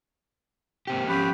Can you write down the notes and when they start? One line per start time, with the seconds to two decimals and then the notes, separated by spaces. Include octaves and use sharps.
0.87 A#3 C4 G4
1.08 F3 C#4 G4 B5 F#6